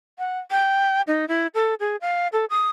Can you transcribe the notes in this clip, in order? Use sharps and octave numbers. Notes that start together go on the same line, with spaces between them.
F#5
G5
D#4
E4
A4
G#4
F5
A4
D#6